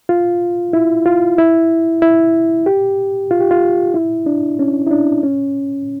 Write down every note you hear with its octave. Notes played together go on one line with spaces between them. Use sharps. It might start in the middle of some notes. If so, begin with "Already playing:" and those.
F4
E4
F4
E4
E4
G4
F4
G4
F4
E4
D4
C#4
E4
D4
C#4